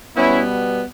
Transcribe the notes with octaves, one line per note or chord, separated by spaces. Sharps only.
B2 G3 B3 C#4 E4